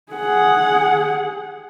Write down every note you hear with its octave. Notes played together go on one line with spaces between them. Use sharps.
G#4 F#5